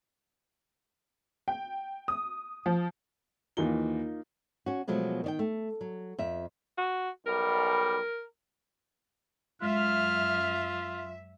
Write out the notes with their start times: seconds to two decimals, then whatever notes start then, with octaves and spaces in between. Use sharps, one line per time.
1.48 G5
2.08 D#6
2.66 F3
3.57 D#2 E3 A#3 D#4 F4 G7
4.66 C#4 F#4
4.88 B2 F3 F#3 G#3 A3
5.24 D#3 D5 G5
5.39 A3
5.81 F#3
6.19 F2 F4 E5
6.78 F#4
7.27 B1 G3 A#4
9.62 F#2 G#3 F4 E5 F6